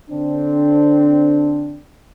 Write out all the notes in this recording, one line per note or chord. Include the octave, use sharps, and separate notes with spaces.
D3 C4 D4